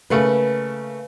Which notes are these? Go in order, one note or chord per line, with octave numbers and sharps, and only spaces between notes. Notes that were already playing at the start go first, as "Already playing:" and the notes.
C#3 A3 A#3 B4